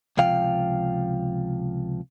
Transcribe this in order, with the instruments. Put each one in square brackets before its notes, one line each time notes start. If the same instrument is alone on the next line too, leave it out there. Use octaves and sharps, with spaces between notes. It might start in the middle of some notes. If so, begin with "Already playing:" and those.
[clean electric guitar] C#2 C3 F3 F5 G5